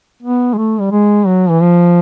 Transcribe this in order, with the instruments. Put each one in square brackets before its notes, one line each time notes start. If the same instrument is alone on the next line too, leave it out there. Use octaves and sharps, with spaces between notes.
[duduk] B3
G#3
A3
G3
G#3
F#3
E3
F3